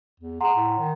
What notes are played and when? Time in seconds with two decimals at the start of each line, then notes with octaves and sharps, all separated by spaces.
0.20 E2
0.41 G#4 F#5 A#5 C6
0.56 A2
0.79 D#3